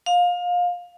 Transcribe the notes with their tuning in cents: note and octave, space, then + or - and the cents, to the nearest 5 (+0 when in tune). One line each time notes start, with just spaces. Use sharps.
F5 +25